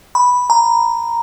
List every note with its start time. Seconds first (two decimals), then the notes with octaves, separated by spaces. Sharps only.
0.15 B5
0.50 A#5